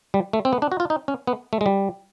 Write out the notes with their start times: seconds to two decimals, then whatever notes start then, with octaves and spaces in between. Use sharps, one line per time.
0.14 G3
0.33 A3
0.45 C4
0.53 B3
0.62 D4
0.72 F#4
0.80 F4
0.90 D#4
1.08 C#4
1.27 B3
1.53 A3
1.61 G#3
1.66 G3